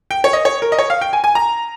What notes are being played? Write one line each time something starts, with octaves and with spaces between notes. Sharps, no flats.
G5
C#5
D#5
C#5
A#4
D#5
C#5
F5
G5
G#5
G#5
A#5